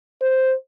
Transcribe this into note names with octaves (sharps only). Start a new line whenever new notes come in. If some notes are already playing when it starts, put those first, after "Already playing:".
C5